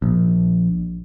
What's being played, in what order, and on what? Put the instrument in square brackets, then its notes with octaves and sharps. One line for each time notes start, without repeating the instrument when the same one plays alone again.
[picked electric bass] A#1